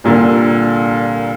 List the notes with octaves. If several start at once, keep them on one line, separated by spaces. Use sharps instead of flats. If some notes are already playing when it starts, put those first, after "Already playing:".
C2 A#2 D3